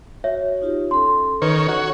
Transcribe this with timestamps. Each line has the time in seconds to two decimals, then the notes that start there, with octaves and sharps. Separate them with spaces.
0.24 F#4 C#5 E5
0.61 D#4 F4 G4
0.91 C#4 A4 C6
1.42 D#3 B4 C#5
1.69 F#4 C#5